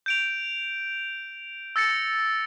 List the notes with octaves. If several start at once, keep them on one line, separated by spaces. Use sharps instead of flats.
G6 D7 F7
E6 A6 A#6 C#7